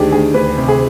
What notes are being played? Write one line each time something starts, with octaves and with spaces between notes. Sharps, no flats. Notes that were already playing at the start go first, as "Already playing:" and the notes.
Already playing: D2 D#3 D4 G4 G#4
D2 G#4
D2 B4
C3
G#4